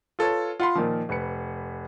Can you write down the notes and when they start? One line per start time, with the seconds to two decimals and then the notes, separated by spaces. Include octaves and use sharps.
0.19 F4 A4 B4 C#5
0.60 F4 F#5 B5 C6
0.75 A#2 D#3 F3
1.09 F1 B4 C#7